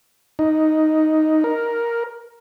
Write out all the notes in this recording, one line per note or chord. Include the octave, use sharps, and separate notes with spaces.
D#4
A#4